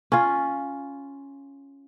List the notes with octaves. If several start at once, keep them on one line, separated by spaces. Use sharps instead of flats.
C#4 F4